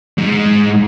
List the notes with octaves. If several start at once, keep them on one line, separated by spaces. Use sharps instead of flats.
G#2